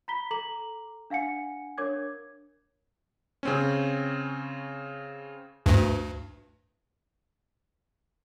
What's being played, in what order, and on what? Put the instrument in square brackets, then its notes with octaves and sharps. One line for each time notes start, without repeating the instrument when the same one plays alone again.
[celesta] A#5 B5 B6 G7
A4 A#5 D6 F#7
D4 F5 F#5 G#5 C#7
D4 A#4 C#5 D6 G#6
[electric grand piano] C#3 C4 C#4
[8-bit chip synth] D2 G2